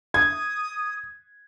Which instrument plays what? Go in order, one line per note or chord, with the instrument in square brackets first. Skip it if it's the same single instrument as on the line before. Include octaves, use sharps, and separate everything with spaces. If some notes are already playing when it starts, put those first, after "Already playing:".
[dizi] D#6 [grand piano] G#6